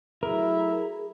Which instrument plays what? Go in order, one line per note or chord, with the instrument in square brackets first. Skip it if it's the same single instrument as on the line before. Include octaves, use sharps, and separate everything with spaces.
[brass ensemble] F#3 A3 E4 [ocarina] G#4 [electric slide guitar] A#4